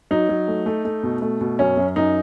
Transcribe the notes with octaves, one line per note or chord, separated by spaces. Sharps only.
F#3 D#4
F#3
A3
A3
A3
B2
A3
B2
F#2 C#4
F#2
F#2 D#4